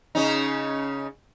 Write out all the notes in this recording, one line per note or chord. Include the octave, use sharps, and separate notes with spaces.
C#3 C#4 D#4